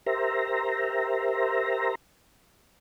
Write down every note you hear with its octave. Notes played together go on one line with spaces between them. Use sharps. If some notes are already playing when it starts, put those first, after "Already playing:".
G4 A#4 C5 E5 A#5